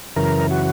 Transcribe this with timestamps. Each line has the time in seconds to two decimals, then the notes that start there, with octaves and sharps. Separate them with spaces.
0.16 F#2 C#3 E3 A#4
0.51 F#4